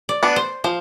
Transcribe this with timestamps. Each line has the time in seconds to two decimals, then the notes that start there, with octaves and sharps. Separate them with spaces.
0.09 D5
0.23 B3 D4
0.36 C5
0.64 F3 C5